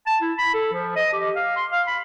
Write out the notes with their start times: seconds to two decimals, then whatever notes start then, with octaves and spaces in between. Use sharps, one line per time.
0.07 A5
0.21 E4
0.38 B5
0.54 A4
0.73 F3
0.96 D#5
1.13 G4
1.36 F5
1.56 C6
1.72 F5
1.87 B5